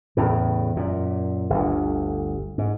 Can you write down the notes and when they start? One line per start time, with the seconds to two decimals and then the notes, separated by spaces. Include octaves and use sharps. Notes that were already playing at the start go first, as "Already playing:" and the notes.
0.17 E2 A2 C#3
0.76 F#2 A#2
1.50 G1 D2
2.58 G#2